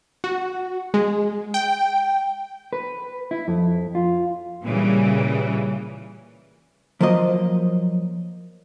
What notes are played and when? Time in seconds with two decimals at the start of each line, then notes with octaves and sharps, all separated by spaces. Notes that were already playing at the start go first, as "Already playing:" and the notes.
0.24 F#4
0.94 G#3
1.54 G5
2.73 B4
3.31 E4
3.48 F2
3.95 F4
4.64 A#2 C#3 E3 G3
7.01 F3 F#3 A#3 C5 D#5